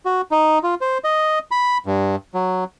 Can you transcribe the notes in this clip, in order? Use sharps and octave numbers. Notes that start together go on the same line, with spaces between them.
F#4
D#4
F4
C5
D#5
B5
G2
F#3